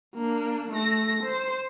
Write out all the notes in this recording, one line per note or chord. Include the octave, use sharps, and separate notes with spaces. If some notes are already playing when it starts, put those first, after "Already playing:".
A#3 D4
A3 A#6
C5